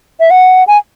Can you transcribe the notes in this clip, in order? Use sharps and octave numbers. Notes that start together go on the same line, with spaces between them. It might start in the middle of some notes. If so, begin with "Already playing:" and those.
E5
F#5
G#5